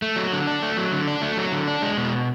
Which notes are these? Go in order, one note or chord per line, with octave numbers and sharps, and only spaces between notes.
A3
F#3
D3
D4
A3
F#3
D3
D4
A3
F#3
D3
D4
G#3
B2